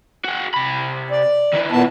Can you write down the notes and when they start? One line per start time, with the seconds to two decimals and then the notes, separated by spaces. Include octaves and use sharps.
0.24 F#4 G#4
0.54 C3 B5
1.11 D5
1.53 D#3 E4
1.71 A#2 B3 A5